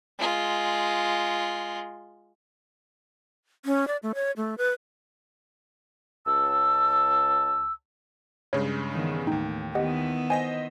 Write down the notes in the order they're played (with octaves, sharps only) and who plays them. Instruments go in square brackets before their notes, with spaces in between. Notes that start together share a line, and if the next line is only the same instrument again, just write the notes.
[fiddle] G#3 F4
[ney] C#4
D5
A3
C#5
A3
B4
[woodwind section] C#2 A5 E6
[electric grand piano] G2 C#3 G#3 [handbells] C#5
[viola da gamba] D#3 E3 B3
[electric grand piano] D#2 G5 [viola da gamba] A2 [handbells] D#4
[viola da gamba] D#3 B3 E4 [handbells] G4 D#5 F#5
[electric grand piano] C5 D#5 A#6 [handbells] G5 G#5